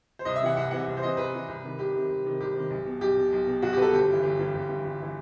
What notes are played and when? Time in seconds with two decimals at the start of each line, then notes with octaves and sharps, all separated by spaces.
0.19 C5
0.25 C2 D#5
0.36 E5
0.42 C3 E3 F#5
0.57 C2 F#5
0.71 C3 E3 F#5
0.87 C2
0.97 C5
1.03 C3 E3 D#5
1.17 C2 B4
1.33 C3 E3
1.48 C2
1.64 C3 D#3
1.79 C2 G4
1.95 C3 D#3
2.09 C2
2.25 C3 D#3
2.40 C2 G4
2.55 C3 D#3
2.70 B1
2.86 B2
3.01 B1 G4
3.17 B2
3.32 B1
3.47 B2
3.62 B1 F#4
3.73 B2 G4 B4
3.82 A4
3.92 G1 G4
4.08 G2 E3
4.23 G1
4.39 G2 E3
4.54 G1
4.69 G2 E3
4.84 G1
5.02 E3